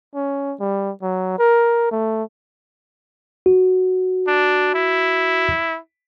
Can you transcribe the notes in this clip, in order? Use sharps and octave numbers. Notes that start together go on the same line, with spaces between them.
C#4
G3
F#3
A#4
A3
F#4
D4
E4